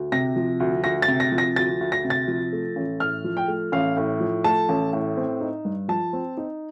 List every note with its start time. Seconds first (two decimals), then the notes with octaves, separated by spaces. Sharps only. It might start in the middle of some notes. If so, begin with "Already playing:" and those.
Already playing: D2
0.12 C3 A#6
0.36 F3
0.60 D2
0.84 D2 A#6
1.02 A6
1.08 C3
1.20 A#6
1.32 F3
1.38 A#6
1.56 D2 A6
1.81 D2
1.92 A#6
2.04 C3
2.10 A6
2.28 F3
2.53 A3
2.76 A1
3.00 A2 F6
3.24 F3
3.37 G5
3.48 A3
3.72 A1 F5
3.97 A2
4.20 F3
4.44 A3 A5
4.69 A1
4.93 A2
5.17 C4
5.41 D#4
5.65 G2
5.88 F3 A5
6.13 C4
6.37 D#4